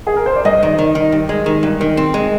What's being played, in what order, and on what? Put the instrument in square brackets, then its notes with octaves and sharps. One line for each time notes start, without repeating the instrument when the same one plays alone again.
[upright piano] G#4
A#4
C5
D5
[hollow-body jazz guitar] G2 [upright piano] D#5
[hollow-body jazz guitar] D#3
D#3
D#3
G2
G#3
D#3
G2
D#3
C4
G#3